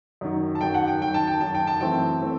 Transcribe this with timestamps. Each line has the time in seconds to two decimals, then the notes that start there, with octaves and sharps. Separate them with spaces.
0.21 F#2 D#3 F#3
0.55 A5
0.61 F#2 D#3 F#3 G5
0.74 F#5
0.88 G5
1.01 F#2 D#3 F#3 G5
1.14 A5
1.27 G5
1.41 F#2 D#3 F#3 A5
1.55 G5
1.67 A5
1.81 F#2 E3 A3 C4 G5
2.22 E3 A3 C4